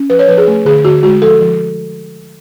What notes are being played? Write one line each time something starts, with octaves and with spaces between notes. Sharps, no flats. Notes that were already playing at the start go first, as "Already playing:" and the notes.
Already playing: C#4
F3 B4
C#5
F3 B4
G#4
A3
D3 G#4
D3 F#4
G#3 F#4
F3 A4
F3